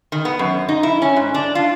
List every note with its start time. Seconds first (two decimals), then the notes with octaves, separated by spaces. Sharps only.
0.12 D#3
0.25 B3
0.39 F#2
0.69 D#4
0.83 E4
1.02 C#4
1.16 G#2
1.34 D4
1.55 F4